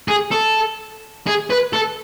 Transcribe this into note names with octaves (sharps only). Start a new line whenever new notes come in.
G#4
A4
G#4
B4
A4